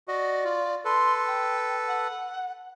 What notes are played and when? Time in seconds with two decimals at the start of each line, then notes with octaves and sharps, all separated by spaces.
0.08 F#4 D5 D#5
0.44 F4
0.85 A4 B4 C6
1.27 G5
1.88 F#5